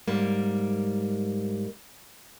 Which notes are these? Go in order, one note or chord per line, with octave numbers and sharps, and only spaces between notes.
G#2 G3 A#3